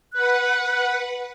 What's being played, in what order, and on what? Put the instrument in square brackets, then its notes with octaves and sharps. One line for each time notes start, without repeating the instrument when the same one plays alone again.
[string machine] B4 F#5 [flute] F#6